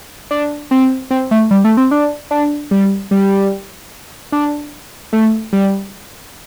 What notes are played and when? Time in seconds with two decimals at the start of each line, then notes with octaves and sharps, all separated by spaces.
0.31 D4
0.71 C4
1.11 C4
1.31 A3
1.51 G3
1.64 A3
1.77 C4
1.91 D4
2.31 D4
2.71 G3
3.11 G3
4.32 D4
5.13 A3
5.53 G3